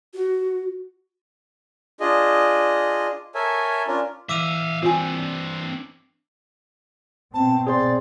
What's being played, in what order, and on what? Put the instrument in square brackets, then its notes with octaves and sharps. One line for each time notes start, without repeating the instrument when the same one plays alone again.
[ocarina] F#4
[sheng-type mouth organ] D4 F4 G#4 D#5
A4 A#4 C#5 E5 G#5
C#4 D4 F4 A#4
[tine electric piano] E3 [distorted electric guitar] E5 F5 [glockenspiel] D6 E6 D#7
[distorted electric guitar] C4 D4 [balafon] F4 G#5
[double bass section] B2 C4 [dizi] A5
[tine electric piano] G#4 C5 C6 [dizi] D5